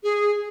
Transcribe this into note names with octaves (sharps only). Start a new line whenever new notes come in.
G#4